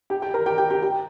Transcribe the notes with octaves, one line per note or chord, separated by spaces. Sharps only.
G4 G5
G4 G5
A#4 A#5
G4 G5
G4 G5
G4 G5
G4 G5